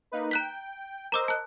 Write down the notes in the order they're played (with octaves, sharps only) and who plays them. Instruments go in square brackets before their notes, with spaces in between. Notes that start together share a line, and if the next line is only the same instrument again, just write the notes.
[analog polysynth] A#3 D#4 B4
[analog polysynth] G5 [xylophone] A#5 F#6 B6
[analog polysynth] A#4 C5 D#5 [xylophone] A#5 D6 E6
[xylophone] A5 F#6